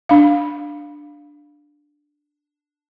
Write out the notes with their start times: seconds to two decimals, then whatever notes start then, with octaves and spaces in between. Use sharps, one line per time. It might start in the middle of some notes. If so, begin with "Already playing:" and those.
0.09 D4 F5